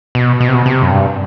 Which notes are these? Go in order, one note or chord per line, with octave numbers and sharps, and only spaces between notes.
B2
B2
C3
B2
C3
F#2
G2